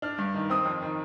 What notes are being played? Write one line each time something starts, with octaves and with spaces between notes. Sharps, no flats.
D4 F6
G2
D#3
C4 D#6
F2
D#3